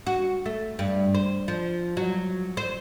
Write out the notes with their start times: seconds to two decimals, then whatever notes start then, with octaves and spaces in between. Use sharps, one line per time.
0.07 F#4
0.46 A3
0.79 G2
1.14 C5
1.48 F3
1.97 F#3
2.57 C5